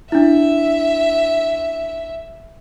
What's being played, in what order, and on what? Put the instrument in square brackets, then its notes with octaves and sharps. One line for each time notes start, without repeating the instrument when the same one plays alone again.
[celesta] D4 E4 [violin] E5